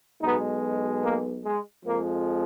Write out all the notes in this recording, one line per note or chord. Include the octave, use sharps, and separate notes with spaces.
B1 B2 G#3 B3 D#4
A#3
G#3
F2 F3 G#3 A#3